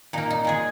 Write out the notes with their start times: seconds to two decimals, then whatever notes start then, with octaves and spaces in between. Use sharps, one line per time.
0.13 A#2 A#3 D#4
0.30 D#4
0.45 A#2 G#3 G#4